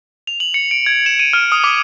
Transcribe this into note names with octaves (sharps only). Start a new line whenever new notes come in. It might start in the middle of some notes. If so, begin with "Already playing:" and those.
F7
F#7
C#7
D7
G#6
E7
D#7
F6
D#6
D6